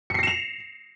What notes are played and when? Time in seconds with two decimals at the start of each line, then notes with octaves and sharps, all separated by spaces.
0.10 C#7
0.14 C7
0.19 A#6
0.23 E7
0.27 F7